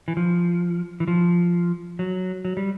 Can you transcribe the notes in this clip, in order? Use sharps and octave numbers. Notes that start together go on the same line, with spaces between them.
E3
F3
E3
F3
F#3
F#3
G3